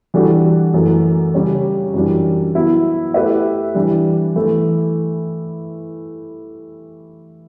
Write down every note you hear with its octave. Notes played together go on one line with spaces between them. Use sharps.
E3 G3 D4 F#4 A4
F#2 E3 A3
C#3 G3 C#4 G4 C#5
F#2 E3 G3 D4
F#3 B3 E4
A3 E4 G4 B4 E5
E3 G3 D4
E3 A3 E4